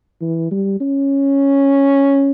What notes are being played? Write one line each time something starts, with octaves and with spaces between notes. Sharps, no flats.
E3
G3
C#4